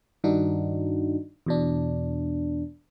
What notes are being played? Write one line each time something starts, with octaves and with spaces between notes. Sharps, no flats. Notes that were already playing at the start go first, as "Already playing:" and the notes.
G2 D#3 D4 D#4 F#4
E2 B2 D4